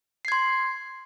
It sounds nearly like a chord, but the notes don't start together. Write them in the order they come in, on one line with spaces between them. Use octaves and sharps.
C7 G#6 C6